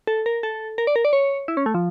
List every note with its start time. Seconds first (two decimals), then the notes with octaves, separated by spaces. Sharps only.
0.07 A4
0.26 A#4
0.43 A4
0.78 A#4
0.87 D5
0.96 A#4
1.05 D5
1.13 C#5
1.48 E4
1.57 C#4
1.66 A3
1.74 F3